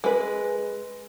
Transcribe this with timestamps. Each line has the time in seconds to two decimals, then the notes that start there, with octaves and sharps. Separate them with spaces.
0.04 G#3 B4